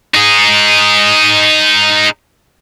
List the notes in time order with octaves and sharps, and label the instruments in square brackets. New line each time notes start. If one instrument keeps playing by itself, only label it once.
[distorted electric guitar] D#4 G#4